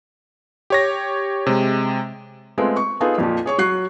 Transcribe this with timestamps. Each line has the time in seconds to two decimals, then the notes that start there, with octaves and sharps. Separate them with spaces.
0.70 G4 C#5 A#6
1.47 C3 G#3
2.58 G#3 A3 B3 C4 F4 G#4
2.77 C#6
3.01 B3 D#4 F4 G#4 A4
3.18 F2 A#2 F3
3.46 G#4 C#5 C#6
3.58 F#3 C#6 F#6 C7